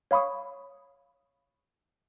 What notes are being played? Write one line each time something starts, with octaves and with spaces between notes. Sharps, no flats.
C#5 F5 B5 C#6 D#6